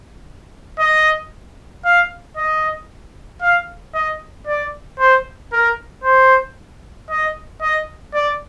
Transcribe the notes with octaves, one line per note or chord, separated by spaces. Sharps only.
D#5
F5
D#5
F5
D#5
D5
C5
A#4
C5
D#5
D#5
D5